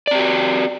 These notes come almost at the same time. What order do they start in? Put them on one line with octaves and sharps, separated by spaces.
D5 C4 G4 F#4